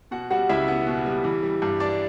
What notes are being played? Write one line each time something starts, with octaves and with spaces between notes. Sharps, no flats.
B2 F#4 F#5
G3 F#4 F#5
C#2 E4 E5
B3
B2
G3
E3
G3
G2
D4 D5